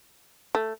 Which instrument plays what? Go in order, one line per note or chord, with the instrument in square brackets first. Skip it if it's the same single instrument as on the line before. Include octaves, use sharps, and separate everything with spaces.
[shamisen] A3